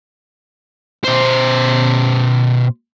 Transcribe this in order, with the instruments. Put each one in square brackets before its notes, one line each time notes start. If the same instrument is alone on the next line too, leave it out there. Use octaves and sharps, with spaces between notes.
[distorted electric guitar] B2 C5